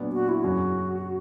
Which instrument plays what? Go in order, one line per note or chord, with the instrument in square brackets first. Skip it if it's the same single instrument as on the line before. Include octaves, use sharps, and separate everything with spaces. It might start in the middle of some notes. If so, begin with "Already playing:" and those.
Already playing: [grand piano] A#2 F#3 B3 D4
[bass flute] F#4
E4
[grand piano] F#2 C#3 F#3 [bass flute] F#4